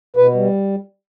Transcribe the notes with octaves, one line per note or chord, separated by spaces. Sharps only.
B2 B4
G3